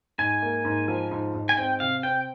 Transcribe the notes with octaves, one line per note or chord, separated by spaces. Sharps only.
G#2 G#5
A#3
G#2
F3
G#2
G#2
G#5
C4 G5
C3 F5
C4 G5